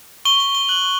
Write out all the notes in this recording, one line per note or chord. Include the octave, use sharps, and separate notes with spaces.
C#6 G7
G7
G7
F#6 F#7